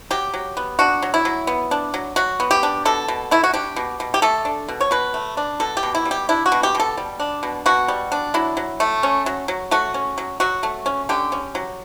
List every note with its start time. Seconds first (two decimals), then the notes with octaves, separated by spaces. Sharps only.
0.11 F#3 G4
0.34 F#3
0.57 B3
0.79 D4 F#4
1.02 F#3
1.14 E4
1.25 F#3
1.47 B3
1.71 D4
1.94 F#3
2.16 F#3 F#4
2.40 B3
2.51 G4
2.63 D4
2.85 B2 A4
3.08 B2
3.31 A3 E4
3.44 F#4
3.54 D4 G4
3.76 B2
4.00 B2
4.14 G4
4.22 A3 A4
4.45 D4
4.69 B2
4.81 C#5
4.91 B2 B4
5.14 A3
5.37 D4
5.60 B2 A4
5.77 G4
5.83 B2
5.95 E4
6.05 G3
6.11 G4
6.29 D4 E4
6.46 F#4
6.52 B2
6.63 G4
6.75 B2 A4
6.98 G3
7.20 D4
7.43 B2
7.66 B2 F#4
7.88 G3
8.12 D4
8.34 F#3 E4
8.57 F#3
8.80 A3
9.03 C#4
9.26 F#3
9.48 F#3
9.71 A3 F#4
9.94 C#4
10.18 F#3
10.40 F#3 F#4
10.63 A3
10.86 C#4
11.09 D3 G4
11.32 C#4
11.55 F#3